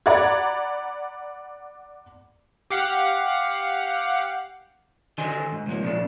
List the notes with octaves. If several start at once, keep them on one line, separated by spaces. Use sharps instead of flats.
D5 F#5 A#5 B5 G#6
G4 F5 F#5
D3 D#3 D4 D#5 G#5 C6
G#2
C#2 G#2 F3 A#3
A#2 C#3 F3 D4